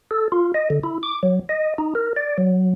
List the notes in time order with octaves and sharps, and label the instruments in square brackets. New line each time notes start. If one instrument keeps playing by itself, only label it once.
[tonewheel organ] A4
F4
D#5
D3
E4
D6
F#3
D#5
D#4
A#4
D5
F#3